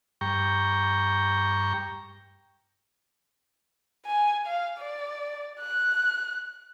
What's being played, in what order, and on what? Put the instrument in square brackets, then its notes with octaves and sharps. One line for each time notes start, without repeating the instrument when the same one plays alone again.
[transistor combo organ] G2 G5 A#5 C#6
[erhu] G#5
F5
D5
F#6